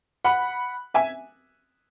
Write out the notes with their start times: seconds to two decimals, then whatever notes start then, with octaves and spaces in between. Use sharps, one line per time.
0.24 F#5 B5
0.94 E5 G#5